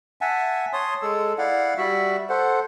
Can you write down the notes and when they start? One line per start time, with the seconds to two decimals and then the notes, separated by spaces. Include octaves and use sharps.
0.21 E5 F#5 G#5 A5
0.73 C#5 A5 C6 D#6
1.02 G#3 A4 E6
1.38 E4 D5 F5 F#5
1.77 G3 F#4 E5
2.29 A4 C5 F#5